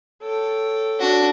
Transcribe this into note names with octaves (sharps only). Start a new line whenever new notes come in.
A4 C#5 G5
D4 F#4